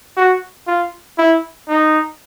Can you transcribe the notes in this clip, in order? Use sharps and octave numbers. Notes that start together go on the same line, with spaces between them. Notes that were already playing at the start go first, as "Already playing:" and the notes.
F#4
F4
E4
D#4